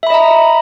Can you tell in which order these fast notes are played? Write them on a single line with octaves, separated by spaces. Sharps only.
E5 B5 D#5 A#5